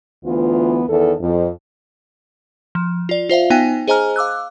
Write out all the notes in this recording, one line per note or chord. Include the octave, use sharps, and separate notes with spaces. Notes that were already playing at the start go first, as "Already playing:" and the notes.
D2 E3 B3 F4
E2 D#3 A4
F2
F3
F4 D5
F4 C5 E5 F5
B3 D#4 G5 G#5
G#4 C5 D#5 G#5 A#5 F6
F5 D6 E6 F#6